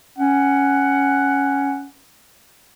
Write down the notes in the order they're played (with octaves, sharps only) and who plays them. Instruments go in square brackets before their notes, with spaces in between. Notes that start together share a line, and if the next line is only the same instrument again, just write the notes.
[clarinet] C#4 [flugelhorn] F#5